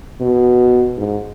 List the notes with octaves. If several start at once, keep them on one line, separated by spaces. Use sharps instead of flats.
B2
G#2